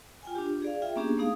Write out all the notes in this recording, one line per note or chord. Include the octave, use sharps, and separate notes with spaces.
F4 G5 G#5
D4 F4 G4
G#4 D5 F5
F4 G#4 E5 G5
A#3 B3 C#4 D4 G4 G#4
A3 B3 D#4 G#4 F5 D#6